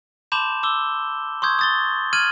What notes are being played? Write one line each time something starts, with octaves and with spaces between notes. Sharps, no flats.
A5 B5 C6 D6 G6 E7
D6 E6 G7
C6 C#6 D#6 G6 G#6
D#6 A6 G7
F6 G#6 D#7 F#7